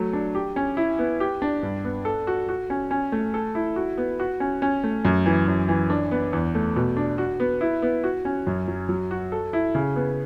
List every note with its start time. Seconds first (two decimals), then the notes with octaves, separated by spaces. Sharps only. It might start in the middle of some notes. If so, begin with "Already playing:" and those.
Already playing: F#3 A3
0.13 D4
0.35 G4
0.56 C#4
0.77 E4
0.99 B3
1.20 G4
1.42 D4
1.63 G2
1.84 B3
2.05 A4
2.27 F#4
2.49 F#4
2.70 C#4
2.91 C#4
3.12 A3
3.34 A4
3.55 E4
3.76 F#4
3.98 B3
4.20 F#4
4.40 C#4
4.62 C#4
4.84 A3
5.05 F#2
5.26 E3
5.48 F#2
5.69 E3
5.90 D4
6.11 B3
6.33 E2
6.55 A3
6.76 B2
6.97 D4
7.18 F#4
7.40 B3
7.61 E4
7.82 B3
8.04 F#4
8.25 C#4
8.47 F#2
8.68 F#3
8.89 F#3
9.11 F#4
9.32 A4
9.53 E4
9.75 C#3
9.96 B3